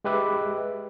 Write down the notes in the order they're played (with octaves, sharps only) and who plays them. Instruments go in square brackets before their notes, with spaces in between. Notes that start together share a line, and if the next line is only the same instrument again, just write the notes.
[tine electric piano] G#3 G4 B4 E5 D6